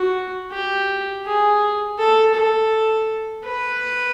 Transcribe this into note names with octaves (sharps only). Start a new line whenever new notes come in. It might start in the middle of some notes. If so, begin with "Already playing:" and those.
Already playing: F#4
G4
G#4
A4
A4
B4